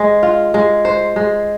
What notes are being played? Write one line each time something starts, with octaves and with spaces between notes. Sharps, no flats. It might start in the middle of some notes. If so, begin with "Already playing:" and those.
Already playing: G#3 C5
F4
G#3
C5
G#3